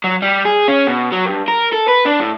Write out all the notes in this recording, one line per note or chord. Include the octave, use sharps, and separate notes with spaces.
F#3
G3
G#4
C#4
B2
F#3
G2
A#4
A4
B4
D4
A2